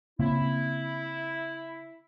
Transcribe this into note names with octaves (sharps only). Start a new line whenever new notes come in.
C#3 A#3 C4 E4